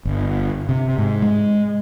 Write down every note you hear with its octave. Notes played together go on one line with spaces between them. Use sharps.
G1
C3
G#2
G#3